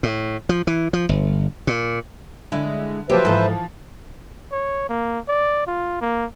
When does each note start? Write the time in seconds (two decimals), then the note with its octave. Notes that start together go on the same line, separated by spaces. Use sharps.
0.03 A2
0.49 F3
0.67 E3
0.93 F3
1.09 G1
1.67 A#2
2.52 D3 G#3 E4
3.10 F3 F#3 G4 B4 C5 E5
3.25 G#2 E3 F3 A4
4.52 C#5
4.89 A#3
5.28 D5
5.67 F4
6.01 A#3